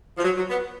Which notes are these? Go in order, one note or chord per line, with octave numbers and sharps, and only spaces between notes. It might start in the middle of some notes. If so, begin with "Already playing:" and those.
F3
F#3
F#3
B3